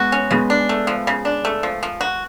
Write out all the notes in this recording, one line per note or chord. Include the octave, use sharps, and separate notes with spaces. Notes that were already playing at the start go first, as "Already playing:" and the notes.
Already playing: G#3 B3 F#4
C#4
C#3 G#3 B3
D4
A3
F3
C#3
D4
A3
F3
F3
F#4